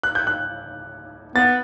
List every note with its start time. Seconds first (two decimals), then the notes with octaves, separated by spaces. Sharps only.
0.03 F#6
0.15 G6
0.27 F#6
1.36 B3 A6